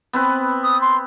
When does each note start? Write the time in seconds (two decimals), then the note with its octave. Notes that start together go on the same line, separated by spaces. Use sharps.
0.13 B3 C4 B4
0.63 D#6
0.81 C6